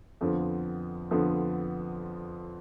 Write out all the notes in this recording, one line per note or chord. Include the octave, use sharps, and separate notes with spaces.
F2 D3 F3 B3
F2 D3 F3 B3